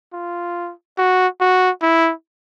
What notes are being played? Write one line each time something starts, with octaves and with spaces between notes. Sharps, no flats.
F4
F#4
F#4
E4